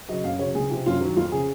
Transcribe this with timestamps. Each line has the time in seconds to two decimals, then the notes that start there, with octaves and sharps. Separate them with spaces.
0.09 C#3 F#3 D#5
0.24 F#2 F5
0.39 C#3 F#3 C#5
0.54 C#2 G#4
0.70 C3 F3
0.86 F#2 F4
1.01 D#3 F#3
1.16 F2 F4
1.32 C#3 F3 G#4